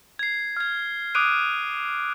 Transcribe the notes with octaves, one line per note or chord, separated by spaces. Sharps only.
G#6 C7
F6 G#6
D6 D#6 F#6 D7 D#7